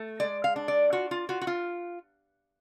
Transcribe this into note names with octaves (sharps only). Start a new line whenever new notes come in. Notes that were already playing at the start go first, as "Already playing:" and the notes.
Already playing: A3
G#3 D5
F5
D4
D5
F4 F#4
F4
F4 F#4
F#4
F4